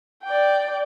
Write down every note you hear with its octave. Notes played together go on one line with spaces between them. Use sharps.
D5 G5